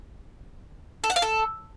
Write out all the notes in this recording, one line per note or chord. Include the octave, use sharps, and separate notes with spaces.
A4
F#5
F5
A4